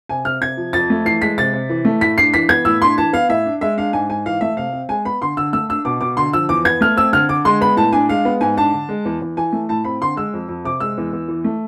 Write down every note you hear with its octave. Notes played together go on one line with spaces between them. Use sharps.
C3 G#5
C3 F6
C3 G#6
F3
F2 A6
A3
E3 C7
G#3 B6
C3 A6
C3
E3
A3
A2 B6
D4 C7
E3 B6
B3 G#6
A2 E6
D4 C6
E3 A5
B3 F5
A2 E5
D4
G#3 E5
D4 F5
G#2 G#5
G#2 G#5
E3 F5
A3 E5
C3 F5
C4
G#3 G#5
B3 B5
D3 C6
D3 E6
A3 E6
D4 E6
B2 D6
B2 D6
D3 C6
F3 E6
E2 D6
B3 G#6
A3 F6
C4 E6
D3 F6
D3 D6
G#3 C6
B3 B5
A2 A5
D4 G#5
G#3 F5
B3
G#2 G#5
D4 A5
D3
G#3
E2
E2
E3 G#5
A3
A2 A5
C4 B5
D3 C6
G#3 E6
F2
F2
C3 D6
G#3 E6
E2
E2
E3
A3